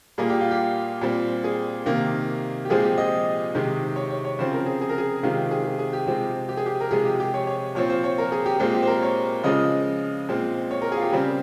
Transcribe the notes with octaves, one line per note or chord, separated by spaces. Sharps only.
A#2 G3 A#3 G#4
G4
F4
G4
A#2 G3 C4
G#4
C3 D#3 A#3
G4
A#2 F3 G#3 C4 G#4
G4
D#5
C3 D#3 G#3 C4
C#5
C#5
C#5
C#3 F3 C4 C5
A#4
G#4
G#4
A#4
G#4
C3 D#3 G#3 C4 F4
G#4
G#4
G#4
G4
C3 F3 G#3 C4
G4
G#4
G4
A#4
C3 F3 G#3 G#4
G4
G4
C#5
C#5
A#2 F3 C4 C#5
C5
C#5
A#4
G#4
G4
A#2 G#3 C4
G4
C5
A#4
C#5
C#3 F3 G#3 D#5
A#2 G#3 C4
C#5
A#4
G#4
F4
G4
C#3 G3 C4